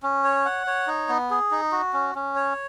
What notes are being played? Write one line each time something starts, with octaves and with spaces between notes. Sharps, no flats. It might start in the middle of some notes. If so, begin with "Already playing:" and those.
C#4
C#5
F#5
C#5
D#4
B3
G#4
D#4
F#4
C#4
C#4
C#5